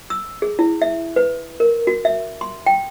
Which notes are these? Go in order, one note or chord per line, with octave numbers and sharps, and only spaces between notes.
E6
G#4
E4
E5
B4
A#4
F#4
E5
C6
G5